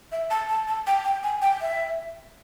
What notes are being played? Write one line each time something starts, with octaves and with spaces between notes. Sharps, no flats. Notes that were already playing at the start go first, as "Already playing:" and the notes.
E5
A5
A5
A5
G5
G5
G#5
G5
E5